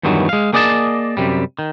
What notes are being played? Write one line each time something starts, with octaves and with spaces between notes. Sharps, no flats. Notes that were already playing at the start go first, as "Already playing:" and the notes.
E2 G2 D#3 E3 F#3
G#3 F5
A#3 G#4 D5 D#5 F#5 A5
F#2 C3 G3
D#3